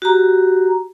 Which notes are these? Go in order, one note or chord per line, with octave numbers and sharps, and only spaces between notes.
F#4 G4 A#5